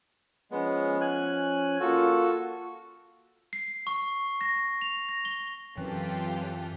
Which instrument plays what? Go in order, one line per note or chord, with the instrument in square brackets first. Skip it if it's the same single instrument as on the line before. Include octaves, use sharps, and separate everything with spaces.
[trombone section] F3 C#4 [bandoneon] G#3 B3
[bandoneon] G#5 F#6
[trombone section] A#3 F4 [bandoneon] F#4 A4
[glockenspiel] C7
C#6
A#6
F7
A#6
G7
[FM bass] F#2 [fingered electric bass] E3 [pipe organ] F#3 C4 B4 [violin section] F4 G4 A4